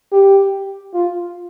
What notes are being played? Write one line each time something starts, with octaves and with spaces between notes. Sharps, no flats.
G4
F4